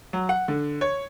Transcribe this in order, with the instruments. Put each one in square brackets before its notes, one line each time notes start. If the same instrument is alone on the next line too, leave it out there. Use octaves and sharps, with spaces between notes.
[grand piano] F#3
F#5
D3
C#5